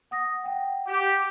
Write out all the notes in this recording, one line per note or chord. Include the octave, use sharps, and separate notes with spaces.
F#5 D#6 A#6
F#5 G5
G4